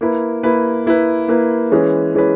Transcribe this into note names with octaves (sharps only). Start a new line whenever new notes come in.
A#3 E4 B4
A#3 E4 B4
A#3 E4 B4
A#3 E4 B4
E3 G#3 C#4 G#4 B4
E3 G#3 C#4 G#4 B4